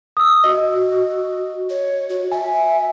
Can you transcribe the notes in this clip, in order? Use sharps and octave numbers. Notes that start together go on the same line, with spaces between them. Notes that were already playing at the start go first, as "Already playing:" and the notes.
D#6 E6
F#4 D#5
C#5
F#4
E5 G#5